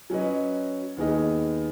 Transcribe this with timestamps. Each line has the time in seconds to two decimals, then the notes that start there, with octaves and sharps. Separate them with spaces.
0.10 F#3 C#4 B4 D#5
0.97 D#2 D#3 B3 G#4 D#5